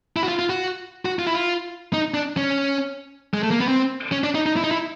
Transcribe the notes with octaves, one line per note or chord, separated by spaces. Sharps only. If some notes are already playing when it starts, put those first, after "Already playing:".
E4
F#4
F4
F4
F#4
F#4
F4
E4
F4
D#4
D4
C#4
G#3
A3
A#3
B3
C4
C#4
D4
D#4
D#4
E4
D#4
E4